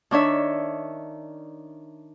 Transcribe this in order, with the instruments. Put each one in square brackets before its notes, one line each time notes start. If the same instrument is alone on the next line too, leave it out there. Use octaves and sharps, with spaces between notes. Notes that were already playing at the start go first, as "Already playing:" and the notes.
[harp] D#3 D4 C#5 E5